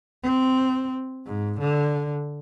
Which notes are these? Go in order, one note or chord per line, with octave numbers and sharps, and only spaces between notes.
C4
G#2
D3